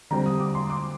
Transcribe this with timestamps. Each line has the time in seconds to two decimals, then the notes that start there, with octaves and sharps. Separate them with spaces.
0.11 D3 G3 C4 A#5
0.26 D#6
0.40 D6
0.55 C6
0.70 D6